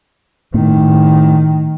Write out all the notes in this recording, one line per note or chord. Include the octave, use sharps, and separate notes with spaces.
A2 D#3